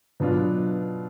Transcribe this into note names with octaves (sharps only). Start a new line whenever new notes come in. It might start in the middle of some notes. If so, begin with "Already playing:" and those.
B2 F#3 B3 D4 F4